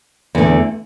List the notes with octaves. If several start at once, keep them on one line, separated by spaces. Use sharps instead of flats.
E2 D3 A3